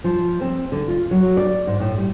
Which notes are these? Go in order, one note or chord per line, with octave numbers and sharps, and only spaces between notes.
F3
C4
D3
F4
F#3
D5
G#2
A2
G3